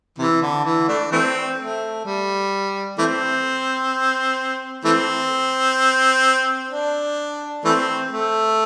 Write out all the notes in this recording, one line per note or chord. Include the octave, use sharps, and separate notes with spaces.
C3 E3
D3
E3
A3 D4
E3 A3 C4
A3
G3
E3 A3 C4
E3 A3 C4
D4
E3 A3 C4
A3